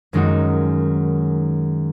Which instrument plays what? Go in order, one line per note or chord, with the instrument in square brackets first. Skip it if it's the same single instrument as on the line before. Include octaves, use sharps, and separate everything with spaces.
[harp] F#2 D#3 G#3 D#4 F#4